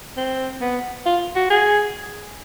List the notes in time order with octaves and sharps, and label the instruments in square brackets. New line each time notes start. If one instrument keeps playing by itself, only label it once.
[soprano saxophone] C4
B3
F4
F#4
G#4